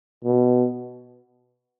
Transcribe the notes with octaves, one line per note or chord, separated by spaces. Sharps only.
B2